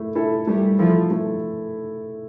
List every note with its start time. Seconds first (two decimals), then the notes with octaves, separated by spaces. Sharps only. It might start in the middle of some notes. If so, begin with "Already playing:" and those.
Already playing: A3 E4
0.15 E4 A4
0.47 G3 A3
0.79 F3 E4 A4
1.11 A3